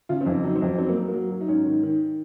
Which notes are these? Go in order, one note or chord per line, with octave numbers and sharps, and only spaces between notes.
C#3 F4
C4
F2
C4
F#3 D#4
C4
F2
C4
F#3 C4
A#3
F#3
A#3
F#3
F#3
D#4
G#2 C#4
D#3
D#3